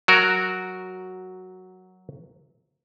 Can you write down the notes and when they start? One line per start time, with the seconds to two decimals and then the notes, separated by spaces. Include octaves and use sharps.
0.08 F#3 F#4 A#4